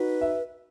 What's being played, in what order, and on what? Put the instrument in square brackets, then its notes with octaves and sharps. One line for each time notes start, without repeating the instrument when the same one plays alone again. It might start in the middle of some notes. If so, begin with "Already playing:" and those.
Already playing: [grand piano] D#4 F#4 [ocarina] B4
[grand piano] E5